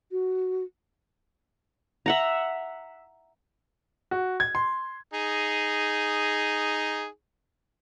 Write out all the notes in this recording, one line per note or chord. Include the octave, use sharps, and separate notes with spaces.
F#4
E5 F#5 A#5
F#4
G#6
C6
D#4 G#4